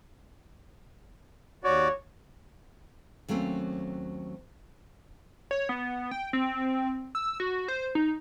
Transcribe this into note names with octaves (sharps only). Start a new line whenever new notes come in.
D#2 F#4 C#5 D5
D#2 F#3 A3 C4 C#4
C#5
B3
G5
C4
E6
F#4
C5
D#4